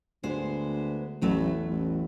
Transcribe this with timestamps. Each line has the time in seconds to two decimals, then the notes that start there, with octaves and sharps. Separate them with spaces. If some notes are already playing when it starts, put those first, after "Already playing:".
0.23 D2 G#3 B3 C5
1.22 A1 E2 F#3 A3
1.69 A1